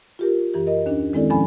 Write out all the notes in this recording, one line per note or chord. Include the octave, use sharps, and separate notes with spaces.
F4 G4 A#4
F#2 E3 G4
A#4 D#5
D#2 C#4 D4
D#3 G#3 C4 E4 A4 D5
E2 A2 F3 C#4 G#5 B5